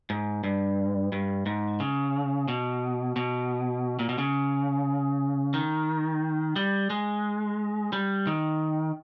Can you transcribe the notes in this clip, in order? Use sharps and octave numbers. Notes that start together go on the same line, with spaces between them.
G#2
G2
G2
G#2
C#3
B2
B2
A#2
B2
C#3
D#3
G3
G#3
G3
D#3